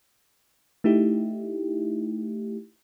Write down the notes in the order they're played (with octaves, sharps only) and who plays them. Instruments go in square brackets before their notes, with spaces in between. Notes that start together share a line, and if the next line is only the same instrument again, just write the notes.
[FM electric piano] A3 D#4 E4 G4